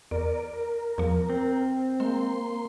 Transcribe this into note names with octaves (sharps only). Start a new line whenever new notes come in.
E2 A#4 D5
A#4
E2 F3
C4
G#3 A#3 C6